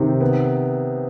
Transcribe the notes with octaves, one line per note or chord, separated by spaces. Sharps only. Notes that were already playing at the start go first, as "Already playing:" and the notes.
Already playing: C3 D#3
B3